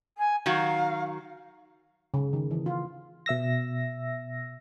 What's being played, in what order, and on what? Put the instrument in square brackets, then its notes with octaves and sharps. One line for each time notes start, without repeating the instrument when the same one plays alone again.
[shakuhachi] G#5
[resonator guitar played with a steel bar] D#3 F#3 F#4 [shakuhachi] F5
[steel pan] C#3
D#3
E3
F4
[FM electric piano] B2 E5 E6 A#6